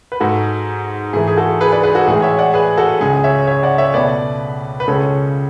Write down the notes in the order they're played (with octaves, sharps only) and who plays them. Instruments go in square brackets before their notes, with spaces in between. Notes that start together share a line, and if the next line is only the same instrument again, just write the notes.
[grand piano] B4
G#2 G#3 F#4 A4
G#2 E3 A3 G#4
G#4
F#4 A4
G#4 B4
B4 D5
G#4 B4
F#4 A4
A2 E3 G#3 G#4
C#5 E5
D5 F#5
G#4 B4
F#4 A4
C#2 C#3 G#3 G#4
C#5 E5
C#5 E5
D5 F#5
C#5 E5
C#2 B2 A3 B4 D5
B4
C#2 C#3 G#3 A4 C#5